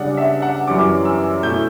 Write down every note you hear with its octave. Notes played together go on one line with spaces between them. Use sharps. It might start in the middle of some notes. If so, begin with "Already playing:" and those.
Already playing: C#3 G3 D4 F#5
E5
F#5
F#2 E3 G3 C#4 D6
E6
B2 A3 E4 G6